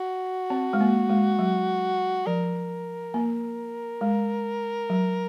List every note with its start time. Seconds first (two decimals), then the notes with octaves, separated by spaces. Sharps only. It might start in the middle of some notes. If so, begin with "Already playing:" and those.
Already playing: F#4
0.50 C4
0.73 G#3
0.81 A#3
1.09 G#3
1.39 F#3
2.26 F3 A#4
3.14 A#3
4.01 G#3
4.90 F#3